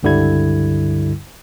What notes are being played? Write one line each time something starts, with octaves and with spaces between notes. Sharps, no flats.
C#2 G2 D3 G3 E4 G#6